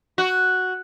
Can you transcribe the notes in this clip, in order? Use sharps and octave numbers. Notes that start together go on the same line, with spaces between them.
F#4